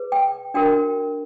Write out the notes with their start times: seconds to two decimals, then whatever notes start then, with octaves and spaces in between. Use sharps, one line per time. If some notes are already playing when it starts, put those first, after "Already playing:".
Already playing: G#4 B4
0.12 G5
0.54 D4 F#4 A#4 G5